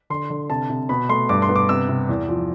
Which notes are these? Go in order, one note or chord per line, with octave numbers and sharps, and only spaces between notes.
D3 C6
D3
C3 A5
C3
B2 B5
A3 C6
G2 D6
C6
B3
D6
C3 E6
C3
E2
F3